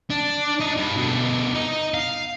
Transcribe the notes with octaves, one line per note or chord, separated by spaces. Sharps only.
D4
D4 D#5
G2
B2 D3
D#4 D#5
F5